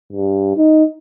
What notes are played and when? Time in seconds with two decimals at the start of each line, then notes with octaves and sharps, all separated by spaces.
0.13 G2
0.57 D#4